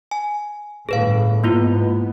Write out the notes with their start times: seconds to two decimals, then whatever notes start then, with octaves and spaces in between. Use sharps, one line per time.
0.11 G#5
0.89 G1 A2 G#4 B4 F5
1.44 G#2 A#3 B3 E4 F4